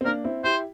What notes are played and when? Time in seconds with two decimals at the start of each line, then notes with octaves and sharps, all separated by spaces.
0.01 C4
0.05 A#3 D4 A#4
0.24 C4 E4
0.44 E4 G4 C5